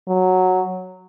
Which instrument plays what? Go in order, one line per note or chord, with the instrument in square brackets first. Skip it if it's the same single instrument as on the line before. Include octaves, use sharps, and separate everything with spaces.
[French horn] F#3